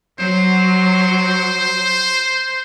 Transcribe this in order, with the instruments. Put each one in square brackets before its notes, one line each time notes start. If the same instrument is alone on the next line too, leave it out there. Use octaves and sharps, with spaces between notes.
[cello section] F#3 [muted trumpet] C5